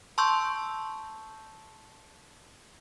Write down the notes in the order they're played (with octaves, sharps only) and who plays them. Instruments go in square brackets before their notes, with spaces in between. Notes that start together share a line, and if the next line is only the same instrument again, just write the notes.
[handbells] A5 C6 C#6 E6 G6